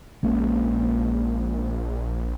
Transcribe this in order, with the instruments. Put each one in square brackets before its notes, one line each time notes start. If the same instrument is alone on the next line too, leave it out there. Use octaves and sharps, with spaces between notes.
[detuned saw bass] A#1 [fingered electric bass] G#3 A#3 C#4